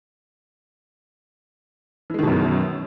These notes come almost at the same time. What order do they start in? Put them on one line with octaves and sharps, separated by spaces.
E3 G#3 D#3 B2 F#2